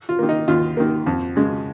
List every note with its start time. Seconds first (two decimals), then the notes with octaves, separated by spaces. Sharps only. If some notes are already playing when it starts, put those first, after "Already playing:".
0.09 F4
0.19 D#3 A#3
0.29 D#4
0.48 D#2 F4
0.77 D#3 A#3
1.07 F2
1.36 C#3 G#3